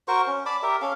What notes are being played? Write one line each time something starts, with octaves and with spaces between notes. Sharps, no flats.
F#4 A#4 C5 C#6
C#4
D5 A5 B5 D6
G4 A#4 E5
C#4 A4 F5